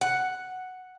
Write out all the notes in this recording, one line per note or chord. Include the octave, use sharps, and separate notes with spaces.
F#5